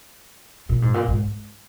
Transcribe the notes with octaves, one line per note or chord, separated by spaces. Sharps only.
A#2
G#2
A#2
G#2